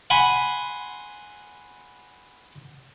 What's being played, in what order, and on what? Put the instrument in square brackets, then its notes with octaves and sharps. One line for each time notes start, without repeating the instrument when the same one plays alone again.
[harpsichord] F#5 G#5 B5 C6